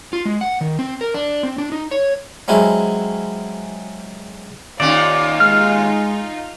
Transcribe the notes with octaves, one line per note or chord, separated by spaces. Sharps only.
F4
G#3
F#5
D#3
C4
A#4
D4
C4
D4
D#4
C#5
F#3 G#3 C4 C#4 E4 F#4
D#2 C#4 D#4 F4 D5
G#3 F6